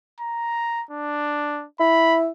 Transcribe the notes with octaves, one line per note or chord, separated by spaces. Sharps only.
A#5
D4
E4 B5